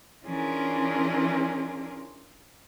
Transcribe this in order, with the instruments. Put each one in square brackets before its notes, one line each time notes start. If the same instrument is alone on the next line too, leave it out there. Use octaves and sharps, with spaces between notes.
[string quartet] E3 C#4 D4 F4 G#4 A#4